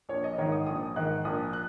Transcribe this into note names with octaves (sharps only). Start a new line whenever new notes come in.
A#1 C#5
D#5
G#2 D#3 C#5
D#6
A#1 D#6
G#2 D#3 F#6
A#1 D#6
F#6